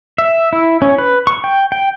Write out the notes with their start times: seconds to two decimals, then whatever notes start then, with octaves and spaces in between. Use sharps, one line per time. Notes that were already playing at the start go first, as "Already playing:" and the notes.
0.18 E5
0.53 E4
0.82 C#4
0.98 B4
1.27 C#6
1.44 G5
1.72 G5